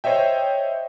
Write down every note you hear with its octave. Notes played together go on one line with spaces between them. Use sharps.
C5 C#5 D#5 E5 G5